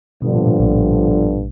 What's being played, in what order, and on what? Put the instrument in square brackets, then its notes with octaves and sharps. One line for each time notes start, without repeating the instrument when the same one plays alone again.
[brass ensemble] G1 G2 D3 F3 [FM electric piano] B2
[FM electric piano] A#2
A2
A#1 A#2